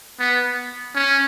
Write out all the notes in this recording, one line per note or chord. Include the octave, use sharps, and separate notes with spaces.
B3
C#4